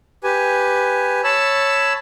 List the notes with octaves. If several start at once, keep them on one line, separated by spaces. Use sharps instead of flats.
G4 B4 G#5
C#5 A5 B5 E6